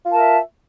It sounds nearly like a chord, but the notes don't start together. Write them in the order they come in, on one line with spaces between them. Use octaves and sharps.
F4 A#4 A5 E5